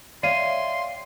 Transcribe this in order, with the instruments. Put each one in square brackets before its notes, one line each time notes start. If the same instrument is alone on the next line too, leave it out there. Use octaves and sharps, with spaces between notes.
[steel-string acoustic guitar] C#5 E5 G5 [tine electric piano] D5 F5 [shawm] C6 [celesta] C7 D#7